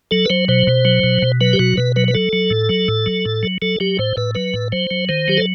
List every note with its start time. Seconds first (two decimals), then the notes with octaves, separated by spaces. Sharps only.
0.11 F#3 A4
0.25 B4
0.30 F#3 C5
0.48 B2 C5
0.67 B2
0.85 F#3
1.04 B2
1.22 B2
1.41 F#3 B4
1.53 G4
1.59 B2 F#4
1.77 B2 B4
1.96 F#3 B4
2.08 B4
2.15 F#3 A4
2.33 F#3
2.51 A2
2.69 F#3
2.88 A2
3.06 F#3
3.25 A2
3.43 F#3
3.62 F#3 A4
3.80 F#3 G4
3.99 A2 C5
4.17 A2 B4
4.35 F#3 B4
4.54 A2
4.72 F#3 C5
4.91 F#3
5.09 D#3 C5
5.28 F#3 G4
5.37 A4